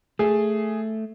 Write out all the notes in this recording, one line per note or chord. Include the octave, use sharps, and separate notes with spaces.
A3 G#4